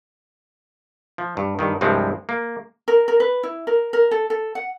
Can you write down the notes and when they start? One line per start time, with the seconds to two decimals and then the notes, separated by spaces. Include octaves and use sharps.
1.18 F3
1.37 G2
1.59 G2 D#3
1.81 C2 G2 F3 G#3 C4
2.29 A#3
2.88 A#4
3.08 A#4
3.20 B4
3.43 E4
3.67 A#4
3.93 A#4
4.11 A4
4.30 A4
4.55 F#5